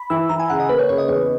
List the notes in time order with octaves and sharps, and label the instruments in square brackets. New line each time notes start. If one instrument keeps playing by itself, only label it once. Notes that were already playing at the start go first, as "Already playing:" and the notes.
Already playing: [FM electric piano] B5
[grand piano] E3 [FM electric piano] E6
[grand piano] E3 [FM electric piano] A#5
[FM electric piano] G#5
[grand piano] C#3 [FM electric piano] F#5
[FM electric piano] D#5
[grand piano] A#3 [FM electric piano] B4
[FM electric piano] C#5
[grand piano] C#3 [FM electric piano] C#5
[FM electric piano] D#5
[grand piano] E2 [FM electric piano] C#5